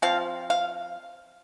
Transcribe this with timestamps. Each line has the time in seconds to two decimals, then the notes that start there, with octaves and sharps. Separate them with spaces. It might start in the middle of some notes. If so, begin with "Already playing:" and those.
0.02 F3 C4 F5
0.50 F5